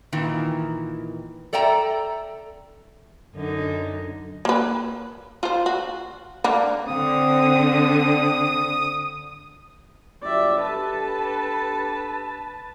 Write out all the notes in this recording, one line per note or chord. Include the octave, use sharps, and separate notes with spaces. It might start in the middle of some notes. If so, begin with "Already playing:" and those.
A#2 D#3 E3
A4 D5 E5 G5 A#5
F#2 D3 D#4
A#3 B4
F4 C5
F#4
D3 A#3
D3 C4 D#6
G1 F#3 G4 D5 E5
D4 G4 A4 B4 A5